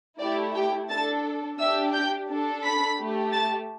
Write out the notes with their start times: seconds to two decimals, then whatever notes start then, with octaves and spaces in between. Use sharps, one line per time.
0.19 A3 E4 G4 D5
0.55 G4 G5
0.90 D4 A4 A5 A6
1.58 D4 G4 E5 E6
1.93 G5 G6
2.29 D4 A4
2.64 B5 B6
2.98 A3 G4
3.32 A5 A6